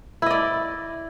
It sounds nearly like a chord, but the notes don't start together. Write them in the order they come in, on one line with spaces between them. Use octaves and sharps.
E4 D#5 D5